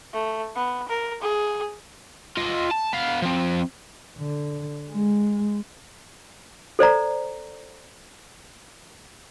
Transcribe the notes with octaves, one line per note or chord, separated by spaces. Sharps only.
A3
B3
A#4
G#4
F4 D#5
A5
B3 F5
F3 C4
D3
G#3
A4 C5 D5 A#5